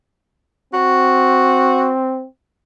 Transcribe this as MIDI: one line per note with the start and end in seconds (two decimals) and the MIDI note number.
0.74 2.26 60
0.74 1.90 66